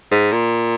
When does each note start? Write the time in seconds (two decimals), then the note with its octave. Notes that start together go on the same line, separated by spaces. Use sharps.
0.12 G#2
0.32 A#2